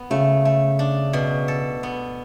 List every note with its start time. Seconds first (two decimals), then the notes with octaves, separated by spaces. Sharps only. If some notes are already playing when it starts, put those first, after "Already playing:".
Already playing: B3
0.10 C#3 A3
0.45 A3
0.79 D4
1.13 B2
1.48 A4
1.83 B3